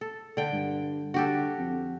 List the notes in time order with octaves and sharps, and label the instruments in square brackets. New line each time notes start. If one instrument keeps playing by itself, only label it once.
[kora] A4
D3 G5
[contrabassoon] G2
[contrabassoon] D3 [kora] F#4 G4 A4
[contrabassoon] F2